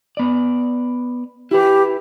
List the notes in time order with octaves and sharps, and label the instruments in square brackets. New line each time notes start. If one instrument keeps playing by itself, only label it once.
[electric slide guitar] B3 D5
[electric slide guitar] E4 B4 [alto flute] G4